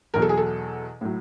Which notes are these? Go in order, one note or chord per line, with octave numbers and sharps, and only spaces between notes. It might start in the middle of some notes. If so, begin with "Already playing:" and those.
E2 B2 F#3 A#4
A4
G#4
A4
A2 F#3